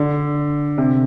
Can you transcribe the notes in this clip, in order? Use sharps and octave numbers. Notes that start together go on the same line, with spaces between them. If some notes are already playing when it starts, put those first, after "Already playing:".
Already playing: D3
C3